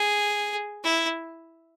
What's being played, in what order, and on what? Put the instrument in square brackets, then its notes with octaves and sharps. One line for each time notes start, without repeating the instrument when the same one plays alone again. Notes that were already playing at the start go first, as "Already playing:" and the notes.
Already playing: [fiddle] G#4
E4